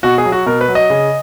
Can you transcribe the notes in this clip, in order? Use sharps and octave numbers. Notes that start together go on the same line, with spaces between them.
B2 F#4
G#4
F#3
F#4
B2 A#4
B4
F#3
D#5
C#3